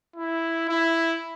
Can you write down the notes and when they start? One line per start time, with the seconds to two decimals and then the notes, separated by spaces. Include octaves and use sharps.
0.16 E4
0.69 E4